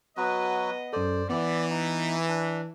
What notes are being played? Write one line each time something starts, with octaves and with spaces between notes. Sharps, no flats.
F#3 B3 F#4 B4 D#5
F#2 A4 C5 D5
E3 B3 B4 D5
D#4
D4